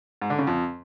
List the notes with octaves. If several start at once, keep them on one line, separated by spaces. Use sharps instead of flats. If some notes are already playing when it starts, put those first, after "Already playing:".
G#2
D3
C#3
F2